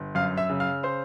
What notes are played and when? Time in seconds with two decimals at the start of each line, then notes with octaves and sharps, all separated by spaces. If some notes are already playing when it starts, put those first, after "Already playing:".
Already playing: G1
0.15 F#2 F5 F6
0.37 E5 E6
0.49 C#3
0.60 F5 F6
0.83 C5 C6